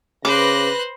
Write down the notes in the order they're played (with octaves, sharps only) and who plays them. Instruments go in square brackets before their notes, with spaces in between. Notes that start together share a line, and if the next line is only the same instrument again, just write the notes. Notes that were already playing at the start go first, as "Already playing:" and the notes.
[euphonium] C#3 [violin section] B4 A#6 [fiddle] C5 F#6 [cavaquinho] D6